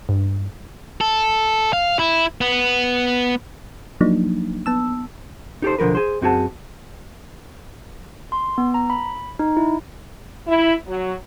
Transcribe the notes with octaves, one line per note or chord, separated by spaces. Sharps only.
G2
A4
F5
E4
B3
F3 F#3 A#3 D4 D#4
B3 A5 E6
D#4 G4 A4 C5
B1 D3 F3 A#4 B4
G#4 C5
F#2 C4 F#4 G#4 A5
C6
B3
A#5
B5
D#4
E4
E4
F#3